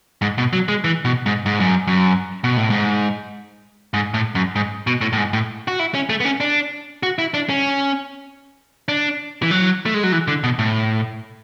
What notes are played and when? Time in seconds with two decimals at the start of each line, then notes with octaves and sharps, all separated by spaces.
0.22 G#2
0.38 B2
0.53 F#3
0.68 G#3
0.84 E3
1.05 B2
1.26 G#2
1.46 G#2
1.60 F#2
1.87 F#2
2.44 B2
2.57 A2
2.70 G#2
3.94 G#2
4.14 A2
4.35 F#2
4.56 G#2
4.87 B2
5.01 A2
5.13 A2
5.17 G#2
5.33 A2
5.68 F#4
5.79 E4
5.95 C#4
6.09 A3
6.20 B3
6.25 C#4
6.40 D4
7.03 F#4
7.18 E4
7.34 D4
7.49 C#4
8.88 D4
9.42 E3
9.51 F#3
9.86 A3
9.94 G#3
10.03 F#3
10.12 E3
10.28 D3
10.44 B2
10.59 A2